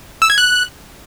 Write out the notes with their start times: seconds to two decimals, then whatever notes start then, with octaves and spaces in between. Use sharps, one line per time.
0.22 E6
0.30 G#6
0.38 F#6